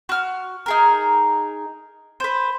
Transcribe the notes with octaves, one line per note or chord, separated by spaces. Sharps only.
F#4 F6
D#4 G#4 A#4
B4 C5